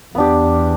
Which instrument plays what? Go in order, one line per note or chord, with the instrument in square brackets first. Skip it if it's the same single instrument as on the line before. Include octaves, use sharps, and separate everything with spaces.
[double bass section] E2 [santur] B3 D4 G4